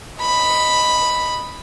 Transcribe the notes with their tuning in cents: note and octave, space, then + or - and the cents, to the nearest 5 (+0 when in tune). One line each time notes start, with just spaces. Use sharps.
D#5 +0 B5 +0